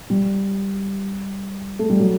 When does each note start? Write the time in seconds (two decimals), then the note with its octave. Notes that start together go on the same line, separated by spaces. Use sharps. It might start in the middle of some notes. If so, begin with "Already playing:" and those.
0.10 G3
1.79 A3
1.90 G3
2.00 F#3